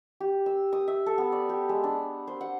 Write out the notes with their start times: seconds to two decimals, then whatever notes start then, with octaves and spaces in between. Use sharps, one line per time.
0.20 G4
0.46 E6
0.73 D#6
0.88 E5
1.06 A4
1.18 B3
1.32 D5
1.49 G4
1.69 G#3
1.84 D4
2.27 C5
2.41 F#5